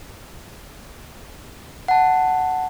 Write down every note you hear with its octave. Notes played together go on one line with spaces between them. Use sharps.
F#5 A5